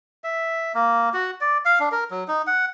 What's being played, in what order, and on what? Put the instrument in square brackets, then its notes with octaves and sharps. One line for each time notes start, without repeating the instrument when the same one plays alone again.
[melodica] E5
A#3
F#4
D5
F5
D4
A#4
F#3
D#4
F#5